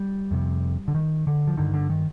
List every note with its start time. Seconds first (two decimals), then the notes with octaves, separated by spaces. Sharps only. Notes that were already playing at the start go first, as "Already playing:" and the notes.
Already playing: G3
0.31 F2 C3
0.88 D3
0.95 D#3
1.27 D3
1.47 F3
1.57 G2 D3 D#3
1.74 D3
1.90 D#3